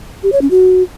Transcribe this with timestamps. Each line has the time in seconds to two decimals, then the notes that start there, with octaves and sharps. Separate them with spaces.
0.23 G4
0.32 C#5
0.42 C#4
0.51 F#4